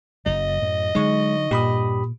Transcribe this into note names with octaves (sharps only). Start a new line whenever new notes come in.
F#1 F#3 D#5
F#2 A2
D3 F#3 G#3 D#4 C#6
G2 A#2 G4 B5 D#6